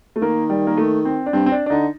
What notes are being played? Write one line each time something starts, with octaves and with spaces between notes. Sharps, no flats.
A3
D#3 A#3
G3
A#3
A3
C4
D4
G2 C4
C4
D4
D4
D3 D#4